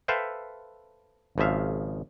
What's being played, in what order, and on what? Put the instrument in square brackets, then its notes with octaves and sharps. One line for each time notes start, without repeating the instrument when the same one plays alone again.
[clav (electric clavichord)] A4 B4 C5 E5 F5 G5
G#1 C#3 F3 E5 F5